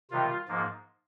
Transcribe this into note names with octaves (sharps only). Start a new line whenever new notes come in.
C3 D#3 G3 F4
G#2 F3 A#3